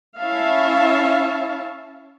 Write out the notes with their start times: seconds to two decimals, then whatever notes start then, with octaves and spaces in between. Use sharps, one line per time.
0.21 C#4 E4 C#5 E5 F5 A5